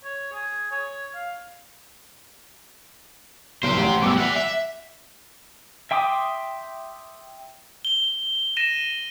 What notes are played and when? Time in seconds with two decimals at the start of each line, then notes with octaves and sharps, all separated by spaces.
0.04 C#5
0.32 G#4
0.71 C#5
1.15 F5
3.63 F#1 G4 C5
3.77 A1
4.03 B2 G3 D6 E6
4.18 E5 F#5
4.36 E5
5.91 E5 G5 C6 D6 D#6
7.85 G7
8.57 A#6 D#7 E7